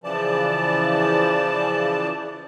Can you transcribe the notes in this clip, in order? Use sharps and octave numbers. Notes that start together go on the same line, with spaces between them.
C#3 E3 F3 D5 A5